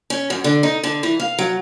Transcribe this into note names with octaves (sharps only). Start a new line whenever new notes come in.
C#4
F#2
D3
D#4
D3
E3
F5
F#3